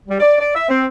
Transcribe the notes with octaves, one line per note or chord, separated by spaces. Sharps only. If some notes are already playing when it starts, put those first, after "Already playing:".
G3
D5
D5
E5
C4